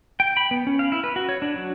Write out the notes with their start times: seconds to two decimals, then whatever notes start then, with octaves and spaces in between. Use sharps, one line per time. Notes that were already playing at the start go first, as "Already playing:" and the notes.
0.20 G5
0.37 B5
0.51 B3
0.67 C#4
0.79 F5
0.92 E4
1.04 B4
1.16 F#4
1.29 C#5
1.42 D4
1.56 F#3